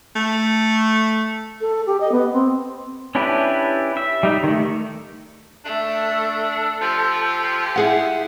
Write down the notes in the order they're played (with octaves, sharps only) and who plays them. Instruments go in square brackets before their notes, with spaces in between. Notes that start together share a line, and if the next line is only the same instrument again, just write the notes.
[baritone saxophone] A3
[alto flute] A4
G4
D#5
B3
C4
[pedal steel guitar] C#4 D4 E4 G4 B4
E5
G3 D#4
D#3 A3
[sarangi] A3 [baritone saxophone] D4 [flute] A4
[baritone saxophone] F3 [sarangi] G4
[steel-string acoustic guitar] E4 G#4 F#5